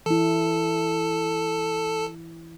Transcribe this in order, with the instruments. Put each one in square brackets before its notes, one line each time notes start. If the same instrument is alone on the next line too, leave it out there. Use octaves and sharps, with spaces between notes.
[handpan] E3 E4 [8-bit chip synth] A4